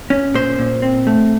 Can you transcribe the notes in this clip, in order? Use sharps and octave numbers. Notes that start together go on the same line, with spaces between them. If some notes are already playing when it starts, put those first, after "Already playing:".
C#4
A#2 C5
A#2
C4
A3